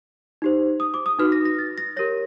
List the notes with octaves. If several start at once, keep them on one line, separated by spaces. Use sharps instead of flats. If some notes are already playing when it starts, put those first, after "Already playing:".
D#4 G4 C5
D#6
D6
D#6
D#4 F#4 B4 F6
A#6
A#6
A6
A#6
G4 A#4 C#5 A#6